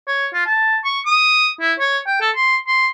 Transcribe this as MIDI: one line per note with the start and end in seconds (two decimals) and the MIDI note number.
0.08 0.28 73
0.34 0.43 65
0.46 0.78 81
0.85 1.00 85
1.06 1.50 87
1.61 1.73 64
1.79 1.99 73
2.07 2.19 79
2.21 2.30 69
2.36 2.57 84
2.68 2.88 84